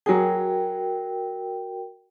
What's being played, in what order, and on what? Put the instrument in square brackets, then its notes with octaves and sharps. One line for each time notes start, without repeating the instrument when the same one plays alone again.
[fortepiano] F#3 G#4 [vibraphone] F#4 A#4 G5